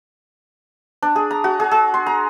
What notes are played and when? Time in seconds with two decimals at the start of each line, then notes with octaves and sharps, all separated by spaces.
1.02 D4
1.16 G#4
1.31 A#5
1.44 F#4
1.60 G#4
1.71 G#4
1.94 C6
2.06 A#5